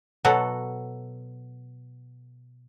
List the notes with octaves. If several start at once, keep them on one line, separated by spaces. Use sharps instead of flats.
B2 F#3 F#4 A4